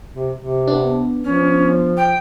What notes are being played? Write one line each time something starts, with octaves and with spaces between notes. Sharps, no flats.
C3
C3
B3 D4
F3 C#4
G5